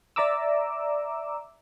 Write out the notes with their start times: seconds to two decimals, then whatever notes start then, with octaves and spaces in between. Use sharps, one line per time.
0.16 D5 E5 A#5 D6 E6